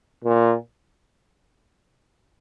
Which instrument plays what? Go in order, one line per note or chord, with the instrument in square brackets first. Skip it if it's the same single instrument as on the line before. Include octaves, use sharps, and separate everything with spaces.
[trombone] A#2